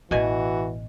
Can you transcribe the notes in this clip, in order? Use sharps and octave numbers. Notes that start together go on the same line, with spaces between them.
A1 B2 E3 F#4 G#5